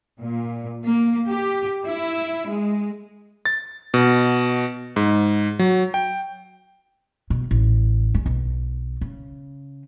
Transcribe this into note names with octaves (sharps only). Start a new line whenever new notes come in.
A#2
A#3
G4
E4
G#3
A6
B2
G#2
F#3
G5
B2
A1
G#3
B1
C#3